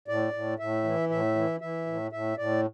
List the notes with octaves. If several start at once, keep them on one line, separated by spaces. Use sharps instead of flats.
A2 D5
A2
A2 E5
E3
A2 E5
E3
E3 E5
A2
A2 E5
A2 D5